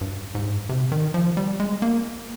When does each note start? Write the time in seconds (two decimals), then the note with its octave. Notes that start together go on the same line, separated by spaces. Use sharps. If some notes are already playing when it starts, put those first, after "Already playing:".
0.01 G2
0.35 G#2
0.69 C3
0.92 D#3
1.14 F3
1.37 G3
1.60 G#3
1.82 A#3